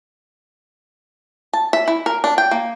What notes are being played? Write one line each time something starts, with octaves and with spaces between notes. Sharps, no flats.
A5
E5
E4
A#4
D4
G5
A#3